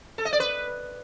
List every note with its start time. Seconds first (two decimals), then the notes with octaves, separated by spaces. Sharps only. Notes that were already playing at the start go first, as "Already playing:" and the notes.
0.18 A4
0.25 D#5
0.33 D5
0.40 B4